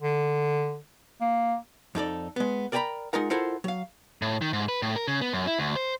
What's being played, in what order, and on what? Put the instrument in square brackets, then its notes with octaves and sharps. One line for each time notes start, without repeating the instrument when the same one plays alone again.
[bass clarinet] D3
A#3
[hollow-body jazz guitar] F2 D#4 A4 D5
G#3 B3
A#4 D5 G5 G#5 A#5 B5
G#3 D#4 F4 A#4 F#5
E4 F4 A4 A#4 C5 F#5
F#3 F5
[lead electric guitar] A2
D#3
G#2
B4
A2
A#4
C#3
B3
F#2
E4
D2
C5